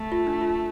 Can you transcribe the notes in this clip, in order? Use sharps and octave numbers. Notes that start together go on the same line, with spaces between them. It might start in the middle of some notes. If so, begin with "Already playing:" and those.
Already playing: A3
F4
D4
F4